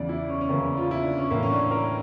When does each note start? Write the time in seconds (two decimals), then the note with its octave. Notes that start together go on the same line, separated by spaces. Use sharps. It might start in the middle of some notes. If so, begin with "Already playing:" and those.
Already playing: E2 C#3 E3 D5
0.09 E4
0.29 C#4
0.41 C#4
0.49 E2 C#3 E3 A#3
0.77 F4
0.91 E4
1.04 D4
1.18 C#4
1.31 A2 E3 A#3
1.43 C#4
1.51 D4
1.71 A#4